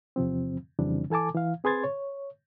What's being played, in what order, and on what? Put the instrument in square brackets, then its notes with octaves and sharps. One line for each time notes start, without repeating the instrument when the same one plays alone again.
[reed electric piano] E2 C3 F3 C4
F2 C#3 E3 G3 C4 D4
E3 A4 G#5 A5 D6
E3 F5
C4 G#4 B4 C6 G#6 A6
C#5